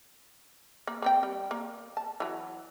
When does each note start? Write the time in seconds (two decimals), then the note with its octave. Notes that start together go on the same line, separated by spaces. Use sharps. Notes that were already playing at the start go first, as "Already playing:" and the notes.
0.87 A#3
1.02 A#3 C4 G5
1.23 G3
1.51 A#3
1.97 A5
2.20 E3 F#3